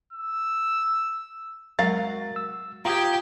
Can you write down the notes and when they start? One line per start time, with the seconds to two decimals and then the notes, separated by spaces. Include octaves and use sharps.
0.13 E6
1.79 F#3 G#3 F#4 A#4 F5 A6
2.36 E6
2.85 F4 G4 G5 A#5 D#6 G#6